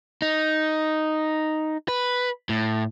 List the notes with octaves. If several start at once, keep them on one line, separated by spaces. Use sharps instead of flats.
D#4
B4
A2